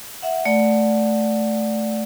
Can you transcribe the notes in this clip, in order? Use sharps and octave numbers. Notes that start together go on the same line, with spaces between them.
E5 F#5
A3 D5 F#5